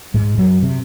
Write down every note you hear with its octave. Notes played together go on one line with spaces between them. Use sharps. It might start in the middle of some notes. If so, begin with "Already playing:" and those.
G#2 G#3
F#2 F#3
C3